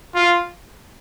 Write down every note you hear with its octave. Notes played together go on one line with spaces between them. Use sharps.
F4